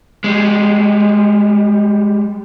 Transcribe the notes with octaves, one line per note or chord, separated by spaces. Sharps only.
G3 G#3